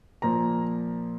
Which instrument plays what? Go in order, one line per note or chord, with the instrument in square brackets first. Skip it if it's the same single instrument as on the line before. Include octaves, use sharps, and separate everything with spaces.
[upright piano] A#2 F3 A#3 A#5